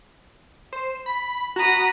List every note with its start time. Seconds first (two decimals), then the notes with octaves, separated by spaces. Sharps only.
0.73 C5
1.06 B5
1.56 F#4 A#5 B5 D#6